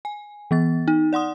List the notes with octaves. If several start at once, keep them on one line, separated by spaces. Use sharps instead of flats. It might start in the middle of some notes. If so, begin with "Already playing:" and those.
G#5
E3 B3 A6
D#4
D5 F#5 C6 D#6